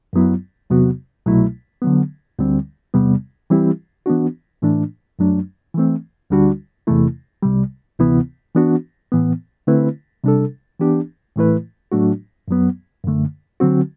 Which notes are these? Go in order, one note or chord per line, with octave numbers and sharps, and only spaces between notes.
F#2 F#3 B3 E4
E2 C3 F#3 B3 F#4
C2 B2 F#3 A3 E4
D3 F#3 B3
D2 D3 G3 C4
E2 C3 G3 B3
E3 G3 C4 E4 G4
E3 B3 D4 F#4
A2 E3 A3 D4
F#2 F#3 A3 D4
E3 A3 C4
D2 D3 G3 D4 F#4
E2 C3 E3 A3 E4
C2 C3 G3
D2 C3 E3 B3 E4
E3 B3 D4 F#4
A2 E3 B3
D3 A3 C4 E4 B4
C3 G3 D4 A4
E3 B3 D4 G4
A2 E3 A3 E4 B4
A2 F#3 A3 D4 F#4
F#2 F#3 B3
F#2 D3 A3
D3 F#3 C4 F#4